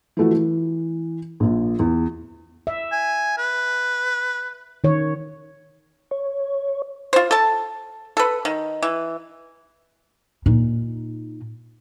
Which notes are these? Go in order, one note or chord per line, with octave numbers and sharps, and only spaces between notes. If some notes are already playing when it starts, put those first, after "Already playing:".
E3 F3 A3 F#4
E3
A#1 A#2
E2
E5
G#5
B4
D#3 C#5
C#5
F4 C5
A4 A5
A4 B4
D#3
E3
A#2 D#4